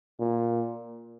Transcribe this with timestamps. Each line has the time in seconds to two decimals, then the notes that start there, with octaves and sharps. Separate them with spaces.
0.20 A#2